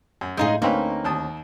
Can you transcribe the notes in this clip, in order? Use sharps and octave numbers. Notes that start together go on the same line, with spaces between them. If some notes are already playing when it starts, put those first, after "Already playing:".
F#2
A2 G#3 D#4 G#4 F5 G6
D2 A#3 C4 C#4 D#4 B4 F5
D#2 A5 D#6